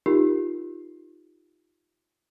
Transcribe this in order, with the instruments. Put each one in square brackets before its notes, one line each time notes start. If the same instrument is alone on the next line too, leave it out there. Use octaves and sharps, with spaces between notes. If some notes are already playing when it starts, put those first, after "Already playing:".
[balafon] D#4 F4 G4 A#4